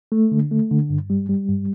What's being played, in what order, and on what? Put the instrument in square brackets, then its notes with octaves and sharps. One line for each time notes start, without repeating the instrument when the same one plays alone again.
[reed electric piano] A3
D3
A3
D3
G2
G3
G3
G2